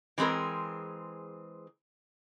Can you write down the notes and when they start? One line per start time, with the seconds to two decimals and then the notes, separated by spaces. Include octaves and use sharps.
0.18 E3 G#3 C4 G#4 A#4